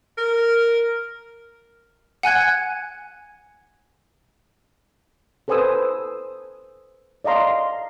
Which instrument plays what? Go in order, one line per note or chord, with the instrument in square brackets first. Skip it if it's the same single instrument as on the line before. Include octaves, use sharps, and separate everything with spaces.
[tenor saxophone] A#4
[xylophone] F#5 G#5 F#6 G#6
[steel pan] A4 B4 C5 G#5 D#6 E6
D5 D#5 F5 A#5 C6